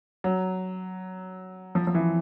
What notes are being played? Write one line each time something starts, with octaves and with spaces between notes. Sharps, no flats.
F#3
F3
F3
E3